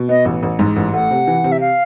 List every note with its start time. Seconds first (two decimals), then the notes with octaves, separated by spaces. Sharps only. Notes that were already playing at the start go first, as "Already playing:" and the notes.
Already playing: B2
0.09 B3 D#5
0.25 A1
0.43 A1
0.59 G#2
0.76 A1
0.93 A3 F#5
1.11 C3
1.27 E3
1.44 C3
1.52 E5
1.60 F5